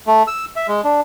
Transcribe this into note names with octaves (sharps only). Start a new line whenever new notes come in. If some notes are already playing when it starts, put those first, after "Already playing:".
A3
E6
E5
G#3
D4